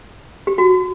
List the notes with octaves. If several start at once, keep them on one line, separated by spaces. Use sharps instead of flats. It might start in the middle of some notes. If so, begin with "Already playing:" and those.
G4
F#4